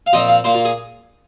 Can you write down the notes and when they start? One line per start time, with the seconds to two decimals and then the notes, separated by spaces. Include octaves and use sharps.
0.06 F5
0.13 A#2 F3 C4 D#5
0.28 F5
0.44 A#2 A#3 C5
0.54 F4
0.65 G#4